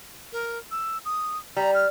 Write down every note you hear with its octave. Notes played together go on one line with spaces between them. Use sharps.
A#4
E6
D#6
G3 A#5
F6